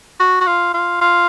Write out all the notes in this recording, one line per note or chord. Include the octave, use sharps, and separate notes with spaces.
F#4
F#4
F4
F4
F4